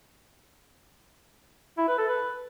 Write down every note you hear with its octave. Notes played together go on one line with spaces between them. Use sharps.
E4
B4
A4
B4